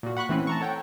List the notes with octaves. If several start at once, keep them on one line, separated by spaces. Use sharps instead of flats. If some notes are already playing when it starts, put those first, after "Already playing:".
A#2 F#4
F#5 B5 C#6 F#6
E3 A3 C4 C#4 B4
A5 A#5 C#6
A4 C#5 F#5 G5